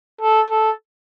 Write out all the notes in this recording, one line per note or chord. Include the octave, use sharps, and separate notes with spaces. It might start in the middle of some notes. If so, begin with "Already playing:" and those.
A4
A4